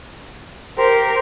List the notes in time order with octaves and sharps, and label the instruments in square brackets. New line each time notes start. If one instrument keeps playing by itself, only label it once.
[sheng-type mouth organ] G4 C5 [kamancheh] A#4